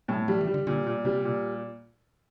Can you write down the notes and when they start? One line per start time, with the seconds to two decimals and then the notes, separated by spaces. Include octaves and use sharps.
0.08 A2 G3
0.28 F3 G3
0.41 E3
0.48 G3
0.54 D3
0.67 A#2 D3
0.86 A#2
1.05 C3 G3
1.25 A#2